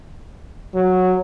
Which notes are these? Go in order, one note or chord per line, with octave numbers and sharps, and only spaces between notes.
F#3